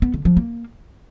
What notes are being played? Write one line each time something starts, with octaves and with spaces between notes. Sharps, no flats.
B3
D3
F3
A#3